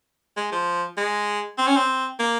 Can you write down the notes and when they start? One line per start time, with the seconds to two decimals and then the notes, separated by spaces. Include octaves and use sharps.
0.37 G#3
0.52 F3
0.97 G#3
1.58 C4
1.67 C#4
1.76 C4
2.19 A#3